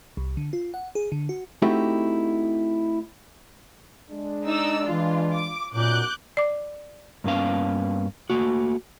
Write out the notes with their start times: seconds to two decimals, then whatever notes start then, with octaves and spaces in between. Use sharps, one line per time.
0.17 C2
0.37 D3
0.53 F4
0.74 F#5
0.95 G#4
1.12 D3
1.29 F#4
1.62 A3 C4 D#4 E4 F#4 G4
4.11 G#3 D4
4.46 D#4 D5 E6
4.86 E3 F4
5.34 D6
5.74 B1 F#2 A#2 D6 F#6 G6
6.37 D5 D6
7.24 G2 D#3 A#3 B3 C#4 F5
8.30 A3 A#3 F#4